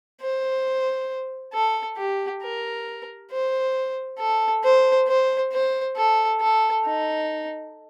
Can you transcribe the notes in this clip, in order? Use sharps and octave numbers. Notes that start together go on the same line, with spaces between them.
C5
A4
G4
A#4
C5
A4
C5
C5
C5
A4
A4
D#4